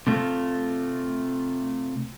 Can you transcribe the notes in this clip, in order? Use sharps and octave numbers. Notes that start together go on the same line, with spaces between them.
C3 A3 F4